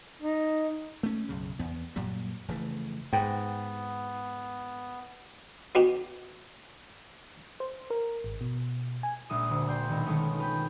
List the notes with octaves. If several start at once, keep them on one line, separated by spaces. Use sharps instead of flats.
D#4
A3 C#4
B1 F#2 C#3
E2 B3
F#2 A#2 F#3 G3
F1 C#3 E3 A3
G#2 B3 G5
B3 D#4 F#4 G4
C5
A#4
G#1
B2
G#5
A#1 G#3 E5 D#6
D2
D5 G5 C6
B1 D#3
D#3 G#3 A3 B3 C#4
F4 B4 G5